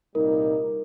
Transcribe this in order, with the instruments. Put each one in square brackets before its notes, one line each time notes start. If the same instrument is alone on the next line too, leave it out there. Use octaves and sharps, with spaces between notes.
[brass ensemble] C2 A#2 G3 A#3 D#4 [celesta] A#4